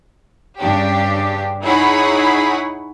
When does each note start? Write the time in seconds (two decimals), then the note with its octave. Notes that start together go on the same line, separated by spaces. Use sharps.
0.57 G2 C#3 D4 G4
1.63 D#4 E4 G#4 C#5 F#5 B5